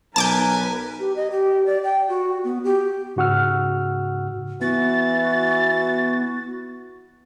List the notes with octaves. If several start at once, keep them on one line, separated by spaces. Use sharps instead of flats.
B1 A#4 B4 G#5 A5 D6 G6
G4
D#5
G4
D5
G5
F#4
B3
G4
G#2 C#3 F#4 F#5 E6 F6
E3 B3 F#4 A6